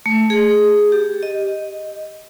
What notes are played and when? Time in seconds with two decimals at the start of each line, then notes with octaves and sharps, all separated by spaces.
0.06 A3
0.30 G#4
0.92 G4
1.23 D#5